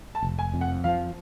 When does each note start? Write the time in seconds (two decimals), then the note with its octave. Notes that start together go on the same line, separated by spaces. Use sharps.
0.15 A5
0.22 F1
0.39 G#5
0.54 F2
0.61 F#5
0.84 F3 F5